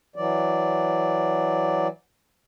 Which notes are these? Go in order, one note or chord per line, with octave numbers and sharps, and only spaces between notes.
E3 F#3 D5